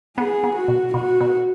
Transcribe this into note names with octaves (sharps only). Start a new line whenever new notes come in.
B3 G#4
B3
F#4
B2
B2 F#4
B2